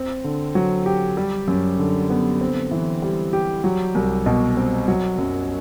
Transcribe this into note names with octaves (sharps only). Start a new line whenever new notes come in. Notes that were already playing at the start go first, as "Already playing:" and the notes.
Already playing: C4
D3
F#3
G4
G3
F#2
D3
B3
C4
E3
G3
G4
F#3
C2
B2
C4
F#3
F#2